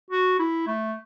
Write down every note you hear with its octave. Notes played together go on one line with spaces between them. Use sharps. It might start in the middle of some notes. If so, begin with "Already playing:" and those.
F#4
E4
A3